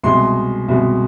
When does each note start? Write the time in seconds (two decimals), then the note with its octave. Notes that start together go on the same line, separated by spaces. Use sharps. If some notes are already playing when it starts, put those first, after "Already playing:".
0.04 C2 B2 G#3 C6
0.68 C2 B2 G#3